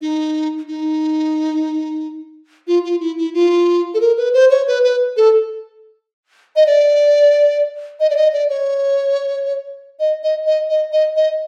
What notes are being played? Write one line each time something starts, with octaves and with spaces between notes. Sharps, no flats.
D#4
D#4
F4
F4
E4
E4
F4
A4
A#4
B4
C5
C#5
B4
B4
A4
D#5
D5
D#5
D5
D#5
D5
C#5
D#5
D#5
D#5
D#5
D#5
D#5